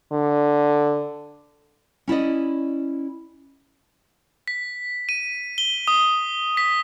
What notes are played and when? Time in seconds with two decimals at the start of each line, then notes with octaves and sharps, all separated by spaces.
0.12 D3
2.08 C#4 E4 D5 D#5
4.48 B6
5.09 D#7
5.58 G7
5.88 D#6
6.57 B6